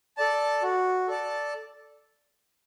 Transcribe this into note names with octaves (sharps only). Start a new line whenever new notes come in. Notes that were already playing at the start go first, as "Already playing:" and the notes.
A4 D5 A5
F#4
A4 D5 A5